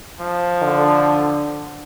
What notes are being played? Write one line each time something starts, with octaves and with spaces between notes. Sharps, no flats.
F3
D3